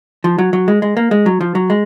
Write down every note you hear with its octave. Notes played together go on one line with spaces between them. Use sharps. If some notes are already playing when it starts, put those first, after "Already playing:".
F3
F#3
F#3
G#3
G#3
A#3
G#3
F#3
F3
F#3
G#3